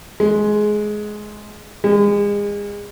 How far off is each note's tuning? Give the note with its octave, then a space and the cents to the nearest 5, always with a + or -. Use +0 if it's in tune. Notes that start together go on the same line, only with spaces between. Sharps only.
G#3 +15
G#3 -30